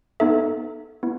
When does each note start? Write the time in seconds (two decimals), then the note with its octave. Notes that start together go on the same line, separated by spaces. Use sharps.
0.20 B3 D#4 A4 E5
1.03 B3 E4